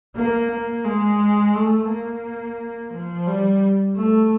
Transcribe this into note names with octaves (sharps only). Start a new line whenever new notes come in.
A#3
A#3
G#3
A3
A#3
F3
G3
A3